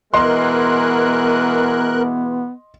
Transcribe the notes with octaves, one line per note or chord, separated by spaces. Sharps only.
B2 E3 G#3 B3 A#4 D#5 C6 F#6